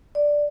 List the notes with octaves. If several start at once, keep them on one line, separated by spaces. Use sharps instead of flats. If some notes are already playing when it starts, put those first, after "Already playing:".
D5